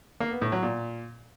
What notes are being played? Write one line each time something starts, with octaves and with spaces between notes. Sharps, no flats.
A#3
B3
A2
F#3
A#2